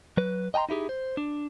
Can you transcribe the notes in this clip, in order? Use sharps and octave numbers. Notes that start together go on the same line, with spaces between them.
F#3 B4
D#5 G5 G#5 A#5 C6
D#4 E4 G4 G#4
C5
D4